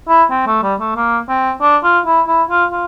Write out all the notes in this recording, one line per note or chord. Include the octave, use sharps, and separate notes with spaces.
E4
C4
A3
G3
A3
A#3
C4
D4
F4
E4
E4
F4
F4